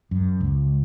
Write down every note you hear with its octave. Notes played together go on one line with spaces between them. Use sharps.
F#2
C#2